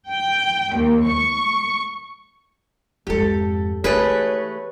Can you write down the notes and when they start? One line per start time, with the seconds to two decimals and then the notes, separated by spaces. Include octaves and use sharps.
0.11 G5
0.76 D#2
1.07 C#6
3.07 F2 G#2 G4 A4
3.84 E3 A3 G4 G#4 B4 C#5